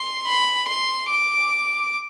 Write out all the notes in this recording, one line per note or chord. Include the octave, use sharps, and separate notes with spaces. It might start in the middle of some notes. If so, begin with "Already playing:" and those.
Already playing: C6
B5
C6
D6